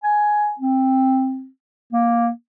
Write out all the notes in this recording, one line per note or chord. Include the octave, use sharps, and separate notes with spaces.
G#5
C4
A#3